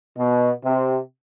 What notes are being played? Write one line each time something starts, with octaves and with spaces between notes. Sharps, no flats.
B2
C3